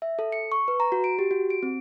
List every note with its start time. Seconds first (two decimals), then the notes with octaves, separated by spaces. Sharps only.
0.02 E5
0.19 A4
0.32 C#7
0.52 C#6
0.68 B4
0.80 A#5
0.92 F#4
1.04 D7
1.19 G4
1.31 F#4
1.50 D7
1.63 C4